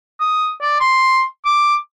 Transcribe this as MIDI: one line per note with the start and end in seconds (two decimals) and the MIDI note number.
0.20 0.53 87
0.61 0.79 74
0.80 1.22 84
1.45 1.75 86